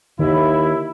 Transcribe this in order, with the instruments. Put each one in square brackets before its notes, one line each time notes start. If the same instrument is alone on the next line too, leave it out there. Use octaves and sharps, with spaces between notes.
[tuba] D#2 [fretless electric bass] D#3 [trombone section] E4